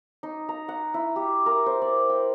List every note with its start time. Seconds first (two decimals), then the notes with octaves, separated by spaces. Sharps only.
0.23 D#4
0.49 A#5
0.68 F#5
0.94 E4
1.16 G4
1.46 A#4
1.66 C5
1.82 D5
2.09 G5